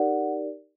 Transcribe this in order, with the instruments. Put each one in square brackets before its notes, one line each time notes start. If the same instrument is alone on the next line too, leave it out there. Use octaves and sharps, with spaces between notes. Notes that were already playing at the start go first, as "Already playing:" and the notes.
Already playing: [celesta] D#4 G4 A#4 D5 F#5